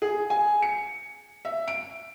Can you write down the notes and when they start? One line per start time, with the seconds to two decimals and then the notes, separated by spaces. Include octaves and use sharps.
0.02 G#4
0.30 G#5
0.62 C#7
1.45 E5
1.68 D7